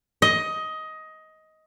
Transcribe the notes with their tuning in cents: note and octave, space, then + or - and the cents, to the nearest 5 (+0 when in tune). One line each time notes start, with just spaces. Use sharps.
D#5 +15